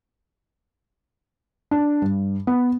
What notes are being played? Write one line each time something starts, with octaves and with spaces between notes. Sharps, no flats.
D4
G2
B3